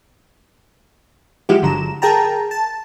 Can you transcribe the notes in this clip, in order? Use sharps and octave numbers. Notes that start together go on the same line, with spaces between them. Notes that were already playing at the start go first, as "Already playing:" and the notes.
F3 G#3 E4 F#4 G4
G1 D3 F#3 A#5 E7
G#4 A#4 G5 A5 A#5
A5